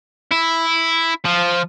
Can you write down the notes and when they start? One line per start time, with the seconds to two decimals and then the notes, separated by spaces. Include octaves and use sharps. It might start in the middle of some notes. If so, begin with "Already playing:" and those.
0.32 E4
1.25 F3